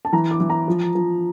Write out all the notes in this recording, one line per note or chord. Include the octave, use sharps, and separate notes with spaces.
A5
E3 A#5
D6
E3
A#5
F3
F3